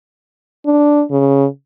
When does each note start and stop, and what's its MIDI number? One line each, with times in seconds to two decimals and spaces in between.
0.66 1.03 62
1.11 1.46 49